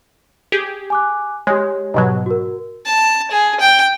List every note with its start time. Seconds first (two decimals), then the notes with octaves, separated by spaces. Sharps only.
0.52 G4 G#4
0.90 G#5 D6 F#6
1.47 G#3 G4 C#5
1.94 G#2 B2 F#3
2.26 F#4 A#4
2.86 A5
3.31 G#4
3.60 G5